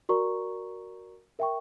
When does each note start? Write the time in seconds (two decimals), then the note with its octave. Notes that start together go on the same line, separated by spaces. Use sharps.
0.09 F#4 A#4 D5 A#5 C#6
1.39 A#4 E5 G5 C#6